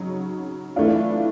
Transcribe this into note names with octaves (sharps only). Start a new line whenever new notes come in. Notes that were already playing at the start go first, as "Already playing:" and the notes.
Already playing: C#3 F#3 D#4
E3 A3 D4 F4